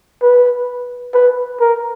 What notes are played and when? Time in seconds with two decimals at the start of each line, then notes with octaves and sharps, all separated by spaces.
0.22 B4
1.14 B4
1.61 A#4